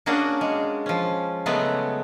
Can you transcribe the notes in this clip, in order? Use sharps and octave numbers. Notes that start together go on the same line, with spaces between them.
A#3 C#4 D4 F#4 G#4
G#3
F3 C#4
C#3 F#3 G#3 A3 B3